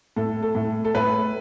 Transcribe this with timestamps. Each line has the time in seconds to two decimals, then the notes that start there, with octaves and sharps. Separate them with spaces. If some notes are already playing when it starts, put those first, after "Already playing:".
0.16 A2 A4
0.42 A4
0.55 A2
0.85 A4
0.95 A2 B4